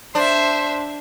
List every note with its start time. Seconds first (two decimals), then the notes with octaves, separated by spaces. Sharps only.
0.15 D4 C5 E5